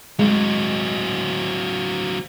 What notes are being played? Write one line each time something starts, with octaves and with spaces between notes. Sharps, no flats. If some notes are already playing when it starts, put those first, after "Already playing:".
F#3 G#3 C4